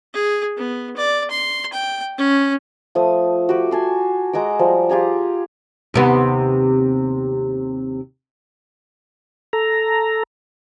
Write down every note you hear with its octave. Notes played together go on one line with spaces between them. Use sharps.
G#4
B3
D5
C6
G5
C#4
F3 A3 D#6
F#4 G4 B4 D6
G#5 A5 C6
G#3 F#4 A#5 D6
F3 G3
F4 G4 G#4 A#5
D#2 C3 B3
A4 A#5